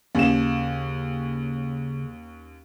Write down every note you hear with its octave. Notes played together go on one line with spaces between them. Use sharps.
D#2 C#3 C#4 E7